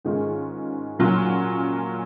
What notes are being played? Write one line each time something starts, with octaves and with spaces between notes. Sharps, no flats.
G#2 D#3 G#3 C#4 F4
A#2 F#3 C#4 F4